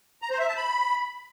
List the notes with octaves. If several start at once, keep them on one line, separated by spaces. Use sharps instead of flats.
A#5
C5
E5
A5
B5